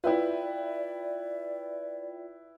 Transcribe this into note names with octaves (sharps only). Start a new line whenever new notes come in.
E4 F4 B4 D5 E5 G5